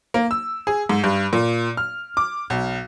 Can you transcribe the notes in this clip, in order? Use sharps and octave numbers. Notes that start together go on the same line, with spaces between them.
A#3
E6
G#4
G#2
G2
A#2
F6
D6
B1